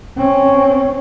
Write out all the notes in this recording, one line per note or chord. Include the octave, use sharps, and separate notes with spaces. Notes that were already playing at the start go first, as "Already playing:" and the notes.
C4 C#4